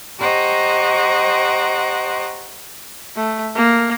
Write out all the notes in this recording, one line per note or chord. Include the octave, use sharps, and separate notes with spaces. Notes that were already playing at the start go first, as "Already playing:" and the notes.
G4 C5 D#5 F#5 A#5 C#6
A3
A#3